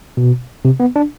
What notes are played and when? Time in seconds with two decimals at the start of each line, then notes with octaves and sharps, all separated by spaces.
0.17 B2
0.65 C3
0.80 B3
0.96 D4